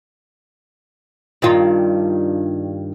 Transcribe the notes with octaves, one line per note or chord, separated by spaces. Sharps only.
G2 D#3 F4